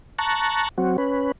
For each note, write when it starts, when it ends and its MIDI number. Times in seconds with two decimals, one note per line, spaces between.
0.19 0.69 81
0.19 0.69 82
0.19 0.69 85
0.19 0.69 90
0.78 0.97 54
0.78 0.97 60
0.78 0.97 66
0.98 1.32 61
0.98 1.32 71